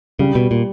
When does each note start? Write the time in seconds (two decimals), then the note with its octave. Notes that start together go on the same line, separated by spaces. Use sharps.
0.19 C#3 G3
0.35 B2
0.51 A#2